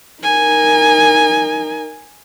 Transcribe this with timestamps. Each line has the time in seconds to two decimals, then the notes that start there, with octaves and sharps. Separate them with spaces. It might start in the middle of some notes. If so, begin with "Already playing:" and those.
0.23 D#4 A#4 G#5